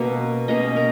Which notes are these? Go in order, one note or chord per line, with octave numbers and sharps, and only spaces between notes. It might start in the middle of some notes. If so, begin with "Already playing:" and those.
Already playing: B2 A#3 C#4
B2 A#3 C#4 D#5
A#4